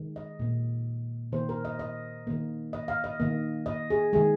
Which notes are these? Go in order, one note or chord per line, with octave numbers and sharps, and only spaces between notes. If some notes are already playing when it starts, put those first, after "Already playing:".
Already playing: D#3 G#3
D#5
A#2 A#3
D#3 A#3 C5
A#4
D#5
D#5
D#3 A#3
D#5
F5
D#5
D#3 A#3
D#5
G#4
D#3 G#3 G#4